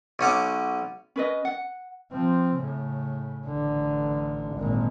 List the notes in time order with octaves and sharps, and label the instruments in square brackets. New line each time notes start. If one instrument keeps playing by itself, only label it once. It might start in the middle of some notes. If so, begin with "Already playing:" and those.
[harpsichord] B1 C#4 F#5 D6
[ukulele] C#4 B4 D#5
F#5
[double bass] F3 C4
A2 C#3
A1 D3
G#1 A#2